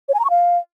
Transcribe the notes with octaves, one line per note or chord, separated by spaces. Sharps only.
C#5
G#5
A#5
C#6
F5